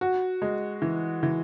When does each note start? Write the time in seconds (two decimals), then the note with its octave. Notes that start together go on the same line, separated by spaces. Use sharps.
0.01 F#4
0.42 G#3
0.82 E3
1.23 E3